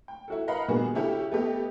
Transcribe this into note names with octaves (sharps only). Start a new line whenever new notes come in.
G5
E4 F#4 A4
A#4 B4 D#5 F5 F#5 B5
A#2 D#3 G3 B3 F#4 G#4
C#3 C#4 E4 F#4 G4 A4
A3 B3 G4 D#5